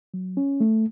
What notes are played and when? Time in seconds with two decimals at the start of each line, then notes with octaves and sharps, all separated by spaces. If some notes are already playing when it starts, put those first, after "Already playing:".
0.14 F#3
0.37 C#4
0.60 A3